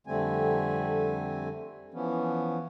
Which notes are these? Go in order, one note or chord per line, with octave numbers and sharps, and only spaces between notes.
F2 D3 G3 A3 C4 G#5
E3 F3 B3 C#4